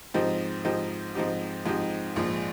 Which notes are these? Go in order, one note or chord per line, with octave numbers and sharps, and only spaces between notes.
G#2 F3 C4 D#4 G4
G#2 F3 C4 D#4 G4
G#2 F3 C4 D#4 G4
G#2 F3 C4 D#4 G4
A#1 G#2 F3